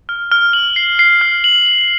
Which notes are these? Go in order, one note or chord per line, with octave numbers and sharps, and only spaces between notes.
F6
F6
F#7
C7
C7
F6
F#7
F#7